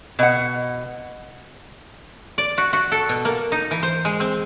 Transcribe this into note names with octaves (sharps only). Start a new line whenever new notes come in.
B2 F#5
D5
F#4
F#4
A4
B2
A#3
D#4
E3
C5
G#3
C4